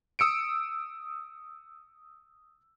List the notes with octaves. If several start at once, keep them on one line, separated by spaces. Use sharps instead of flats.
D#6 E6 C#7 D7